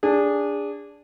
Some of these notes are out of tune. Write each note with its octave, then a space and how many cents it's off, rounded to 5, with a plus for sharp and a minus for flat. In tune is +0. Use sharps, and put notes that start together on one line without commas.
D4 -10 G#4 -25